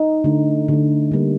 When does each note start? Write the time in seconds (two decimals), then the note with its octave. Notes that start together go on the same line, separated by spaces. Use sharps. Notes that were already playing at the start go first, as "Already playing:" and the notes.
Already playing: D#4
0.24 D3 A3
0.68 D3 A3
1.12 D3 G3 A#3